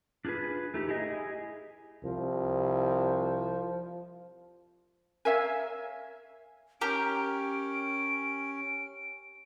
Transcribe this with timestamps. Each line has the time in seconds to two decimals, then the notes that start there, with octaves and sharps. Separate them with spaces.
0.25 D4 F4 G4 G#4 B4
0.74 A3 D#4 G4
0.88 E4 G4 G#4 D#5 E5
2.04 C2 F3
5.25 A#4 C#5 E5 F5 G#5
6.81 C#4 G4 A#4 D7